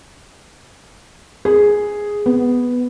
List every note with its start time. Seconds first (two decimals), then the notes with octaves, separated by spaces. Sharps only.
1.45 G#4
2.26 B3